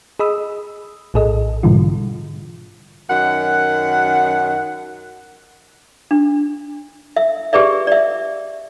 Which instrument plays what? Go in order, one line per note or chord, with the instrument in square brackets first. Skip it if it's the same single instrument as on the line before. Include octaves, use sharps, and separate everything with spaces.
[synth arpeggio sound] G#4 D#5 B5 D#6 E6
A#1 A2 G#4 A4 D#5
G#2 B2 D3 E3 G3 F4
[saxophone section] F#2 D#3 F#5
[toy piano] D4
E5
G4 G#4 B4 D5 E5
D5 E5